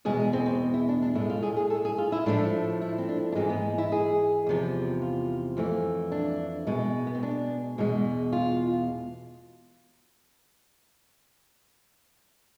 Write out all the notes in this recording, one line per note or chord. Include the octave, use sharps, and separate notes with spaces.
E2 B2 G#3 G#4
G#4
C4
C4
E4
D4
D4
A2 G#3 E4
F4
G#4
G#4
A4
G#4
F4
E4
A2 F3 A3 D4
E4
C4
D4
D4
G#2 E3 G#3 C4
B3
E4
G#4
E2 C3 F3
F4
F2 E3 A3
D4
B2 G#3
B3
C4
D4
E2 B2 G#3
F4